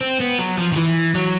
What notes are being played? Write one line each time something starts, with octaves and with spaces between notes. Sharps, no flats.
C4
B3
F#3
F3
D#3
E3
F#3